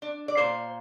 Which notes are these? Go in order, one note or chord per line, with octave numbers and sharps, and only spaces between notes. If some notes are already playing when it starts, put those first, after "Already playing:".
D4
D5
A#2 C5